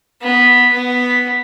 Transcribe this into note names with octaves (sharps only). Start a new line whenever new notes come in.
B3
B3